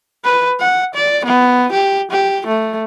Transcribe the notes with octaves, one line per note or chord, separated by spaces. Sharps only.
B4
F#5
D5
B3
G4
G4
A3